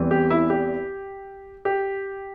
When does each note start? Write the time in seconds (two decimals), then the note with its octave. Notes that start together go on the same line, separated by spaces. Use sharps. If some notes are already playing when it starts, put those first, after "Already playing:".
Already playing: E2 E3 G3 C4
0.11 G4
0.30 E4
0.50 G4
1.65 G4